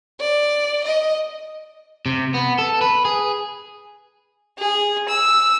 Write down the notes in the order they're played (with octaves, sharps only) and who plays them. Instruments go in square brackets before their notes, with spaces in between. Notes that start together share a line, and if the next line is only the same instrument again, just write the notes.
[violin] D5
D#5
[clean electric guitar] C3
B3
A4
B4
G#4
[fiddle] G#4
E6